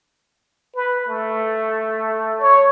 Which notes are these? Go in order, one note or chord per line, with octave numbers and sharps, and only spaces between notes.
B4
A3
C#5